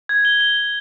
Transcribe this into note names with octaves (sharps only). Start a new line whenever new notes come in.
G#6
G7
G7
G7